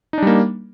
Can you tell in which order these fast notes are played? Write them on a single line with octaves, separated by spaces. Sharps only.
D#4 D4 G3 A#3